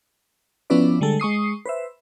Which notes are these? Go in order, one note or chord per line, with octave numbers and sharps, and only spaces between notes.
F3 B3 C#4 E4 B4 D5
D3 G3 G#3 A4
G#3 C#6 D#6 C7
B4 C5 E5